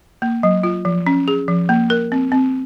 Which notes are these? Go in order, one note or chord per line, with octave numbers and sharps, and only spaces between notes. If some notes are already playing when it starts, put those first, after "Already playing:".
A#3
F#3
F4
F3
C#4
G#4
F3
A#3
A#4
C4
C4